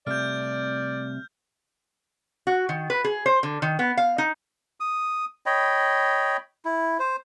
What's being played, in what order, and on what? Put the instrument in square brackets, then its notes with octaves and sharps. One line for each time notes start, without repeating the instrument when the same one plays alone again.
[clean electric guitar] C2 C3 A3 [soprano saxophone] D5 [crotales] F6 G6
[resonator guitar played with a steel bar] F#4
D#3
B4
G#4
C5
D3
D#3
B3
F5
D#4
[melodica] D#6
C#5 D#5 G5 B5
E4
C5